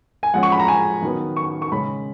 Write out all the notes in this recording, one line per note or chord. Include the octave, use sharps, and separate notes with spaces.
G#5
F3 G#3 C#4 F#5
C#6
B5
A#5
G#5
D#3 F#3 B3
C#6
C#6
C#3 G#3 C#4 B5